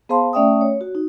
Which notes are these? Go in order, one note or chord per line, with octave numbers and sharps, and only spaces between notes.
B3 G#4 C5 F5 A5 C6
A3 C#4 D5 E5 G5 D#6
C#5
F#4
D#4